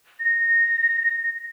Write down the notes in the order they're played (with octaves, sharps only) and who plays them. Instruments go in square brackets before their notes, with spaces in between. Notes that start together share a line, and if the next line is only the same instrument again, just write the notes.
[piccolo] A#6